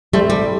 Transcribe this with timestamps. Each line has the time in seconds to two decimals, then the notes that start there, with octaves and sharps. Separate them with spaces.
0.13 G3 A3 C4 E4
0.30 G3